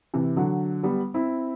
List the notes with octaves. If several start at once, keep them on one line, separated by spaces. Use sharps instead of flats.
C3 E3
D3 F#3
G3 B3
C4 E4